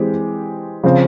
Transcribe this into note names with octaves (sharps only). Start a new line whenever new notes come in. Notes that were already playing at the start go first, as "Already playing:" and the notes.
Already playing: E3 G#3 C4 G4
C#3 F3 C4 F4